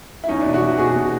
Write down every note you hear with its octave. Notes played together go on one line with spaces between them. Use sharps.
E4
E2 C#4 D#4
B2 D4 E4
E4 F#4
E2
B2 F#4 G#4
B2